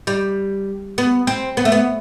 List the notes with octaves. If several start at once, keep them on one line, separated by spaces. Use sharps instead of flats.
G3
B3
C4
B3
A3
B3